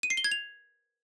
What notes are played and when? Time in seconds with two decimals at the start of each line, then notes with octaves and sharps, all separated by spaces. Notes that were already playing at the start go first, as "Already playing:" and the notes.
0.03 D#7
0.10 C7
0.17 G7
0.24 G#6
0.32 F7